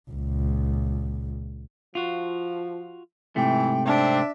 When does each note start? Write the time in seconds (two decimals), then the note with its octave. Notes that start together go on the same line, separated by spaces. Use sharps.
0.11 C#2 A#2
1.95 F3 F4 F#4
3.36 G#2 C3 E3 A3 G5
3.86 C4 D4 E5